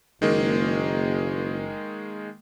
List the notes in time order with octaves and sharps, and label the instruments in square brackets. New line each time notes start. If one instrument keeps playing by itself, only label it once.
[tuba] F#1 [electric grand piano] D#3 G#3 A#3